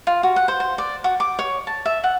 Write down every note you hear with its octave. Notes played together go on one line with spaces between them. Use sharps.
F4
F#4
F#5
C5
C5
D5
F#4
D6
C#5
A5
E5
F#5